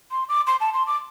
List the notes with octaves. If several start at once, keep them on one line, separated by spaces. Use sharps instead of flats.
C6
D6
C6
A5
C6
D6